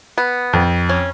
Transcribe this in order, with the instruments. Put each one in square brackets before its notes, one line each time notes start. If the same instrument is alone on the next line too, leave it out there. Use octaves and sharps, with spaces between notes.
[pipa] B3
[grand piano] F2
[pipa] C#4